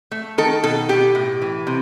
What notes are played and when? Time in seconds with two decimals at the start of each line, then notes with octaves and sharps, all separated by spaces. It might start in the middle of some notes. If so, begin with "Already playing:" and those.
0.11 A3
0.38 D#3 A4
0.63 B2 A4
0.89 B2 G4
1.15 A2
1.42 E3
1.67 C3